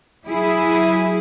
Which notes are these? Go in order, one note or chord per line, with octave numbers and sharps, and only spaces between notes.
F#3 E4 G#4